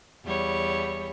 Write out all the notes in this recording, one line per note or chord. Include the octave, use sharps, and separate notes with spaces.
E2 G3 C#5